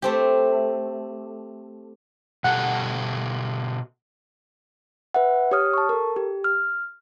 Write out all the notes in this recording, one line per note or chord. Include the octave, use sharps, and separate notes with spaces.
A3 C4 G4
B2 G4 A4 F#5
B4 E5 F#5
G4 C#5 D#6 F6
A5 C#6
A4 A#4
G4
F6